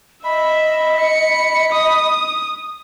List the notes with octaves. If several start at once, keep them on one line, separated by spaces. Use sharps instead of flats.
D#5 E5 B5
C#7
D#6